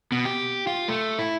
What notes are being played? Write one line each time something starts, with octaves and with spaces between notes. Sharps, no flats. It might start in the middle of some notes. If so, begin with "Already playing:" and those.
B2
G4
F4
A3
E4